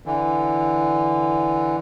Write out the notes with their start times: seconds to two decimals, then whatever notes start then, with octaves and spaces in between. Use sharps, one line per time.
0.06 D3 E3